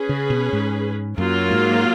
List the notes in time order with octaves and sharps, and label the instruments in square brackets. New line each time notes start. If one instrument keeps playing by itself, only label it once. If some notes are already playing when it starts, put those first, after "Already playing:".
Already playing: [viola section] C#4 G#4 B4
[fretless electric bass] C#3
B2
G#2
[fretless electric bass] F#2 [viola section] F#3 A#3 F4
[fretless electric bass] G#2